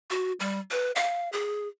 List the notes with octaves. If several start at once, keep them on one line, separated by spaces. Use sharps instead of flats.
F#4
G3
B4
F5
G#4